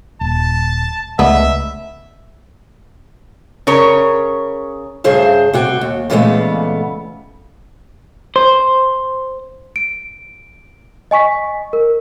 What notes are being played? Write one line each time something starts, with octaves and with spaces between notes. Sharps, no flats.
D#1 A5
C#2 C#3 A3 B3 D4 D#4 E5
C#3 A#4 C#5
G2 C#3 G#4 C5 E5
C3 F#4 G5
D#2
A#2 C#3 E3 G#3 A3 B3
C5
D7
D#5 G#5 C#6 B6
A#4